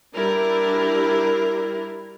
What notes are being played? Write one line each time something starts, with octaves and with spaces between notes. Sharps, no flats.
G3 D4 E4 A#4